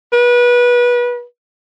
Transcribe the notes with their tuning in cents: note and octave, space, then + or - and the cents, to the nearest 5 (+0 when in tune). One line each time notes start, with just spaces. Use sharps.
B4 -25